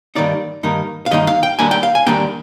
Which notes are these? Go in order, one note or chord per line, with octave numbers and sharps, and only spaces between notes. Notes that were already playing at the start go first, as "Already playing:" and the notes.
G2 D#3 A#3 D#4 D5
G2 D#3 A#3 D#4
F5
G2 D#3 A#3 D#4 D#5
F5
G5
D#2 D#3 G3 A#3 D4 G#5
G5
F5
G#5
D#2 D#3 G3 A#3 D4 G5